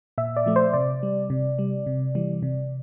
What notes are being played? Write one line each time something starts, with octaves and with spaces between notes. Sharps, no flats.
A#2 E5
D5
F3 A3
C5
C3 D5
G3
C3
G3
C3
E3 G3
C3